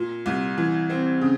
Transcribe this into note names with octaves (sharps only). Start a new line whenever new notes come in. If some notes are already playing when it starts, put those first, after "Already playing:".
Already playing: A#2
C2
E3
C4
C#3